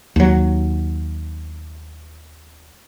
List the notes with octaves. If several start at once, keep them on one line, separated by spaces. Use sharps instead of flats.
D#2 F#3